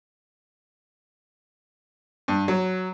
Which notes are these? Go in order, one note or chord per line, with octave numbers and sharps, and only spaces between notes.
G2
F#3